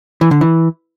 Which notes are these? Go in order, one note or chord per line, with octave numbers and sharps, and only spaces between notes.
E3
D3
E3